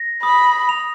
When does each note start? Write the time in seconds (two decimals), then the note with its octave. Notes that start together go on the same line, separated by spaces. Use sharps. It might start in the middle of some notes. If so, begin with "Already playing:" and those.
Already playing: A#6
0.23 B5 D#6
0.69 F7